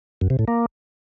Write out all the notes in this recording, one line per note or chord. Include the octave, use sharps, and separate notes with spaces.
F#2
C3
A2
A#3